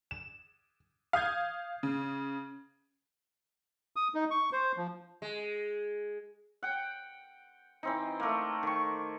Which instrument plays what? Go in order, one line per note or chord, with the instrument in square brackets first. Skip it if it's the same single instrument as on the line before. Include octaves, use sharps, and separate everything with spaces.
[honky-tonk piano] E7
F5 D#6 G6 G#6
C#3
[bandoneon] D#6
D#4
C#6
C5
F3
[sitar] G#3
[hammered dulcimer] F#5 G5
E3 C4 D#4
A3 A#3
D#3 C#6